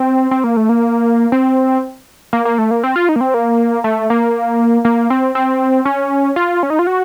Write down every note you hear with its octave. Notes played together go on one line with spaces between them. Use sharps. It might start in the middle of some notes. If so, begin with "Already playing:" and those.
Already playing: C4
C4
A#3
A3
A#3
C4
A#3
A#3
A3
A#3
C4
F4
D#4
A#3
C4
A#3
A3
A#3
A#3
C4
C4
C#4
F4
C#4
D#4
F4
F#4